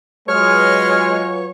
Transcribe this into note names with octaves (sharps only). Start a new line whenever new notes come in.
F#3 G#3 F4 G#4 B4 C#5 F6